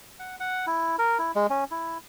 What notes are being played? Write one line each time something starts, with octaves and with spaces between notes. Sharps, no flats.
F#5
F#5
E4
A#4
E4
G#3
C#4
E4